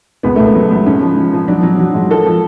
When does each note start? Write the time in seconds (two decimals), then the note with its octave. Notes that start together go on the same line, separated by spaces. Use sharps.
0.23 C#2 B3
0.36 C#2 A3
0.47 B3
0.55 F#3
0.70 C#2
0.86 G#2 C#4
1.02 F3
1.17 F3
1.33 F3
1.48 F#3 D4
1.63 F#3
1.79 F#3
1.94 G#2
2.10 F3 A4
2.26 F3